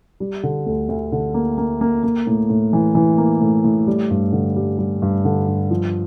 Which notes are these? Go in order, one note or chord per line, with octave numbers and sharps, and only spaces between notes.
G3
D3
D2
D2
D3
A#3
A#3
A#3
A#3
A2
A2
E3
E3
A#3
A2
A2
G3
G2
D3
G3
G3
G2
D3
G2
F3